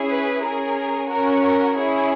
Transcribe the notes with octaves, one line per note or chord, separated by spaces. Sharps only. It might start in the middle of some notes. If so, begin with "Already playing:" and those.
Already playing: C#4 E4 G#4
B4
C#4 G#4 A#4
C#4 F#4 A#4
A#4
C#4 E4 G#4